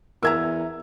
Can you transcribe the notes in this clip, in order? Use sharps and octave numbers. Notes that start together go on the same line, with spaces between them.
E2 A#4 E5 A#5 E6 G#6